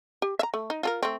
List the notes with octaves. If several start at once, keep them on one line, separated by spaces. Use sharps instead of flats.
G4
E5 A#5
A3
D#4
F4 A4 A#4
A3 C4